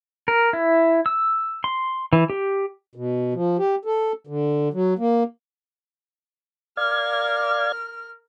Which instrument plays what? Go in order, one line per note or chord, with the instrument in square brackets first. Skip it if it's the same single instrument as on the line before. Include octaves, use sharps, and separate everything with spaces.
[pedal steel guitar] A#4
E4
E6
C6
E3
G4
[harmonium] B2
F3
G4
A4
D3
F#3
A#3
[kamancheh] A#4 F6 [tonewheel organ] D5 F5 G#6